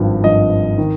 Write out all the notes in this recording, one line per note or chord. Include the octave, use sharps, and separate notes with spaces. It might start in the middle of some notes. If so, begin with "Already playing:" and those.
Already playing: G#1 G2 F3
G#1 G2 F3 D#5
D#3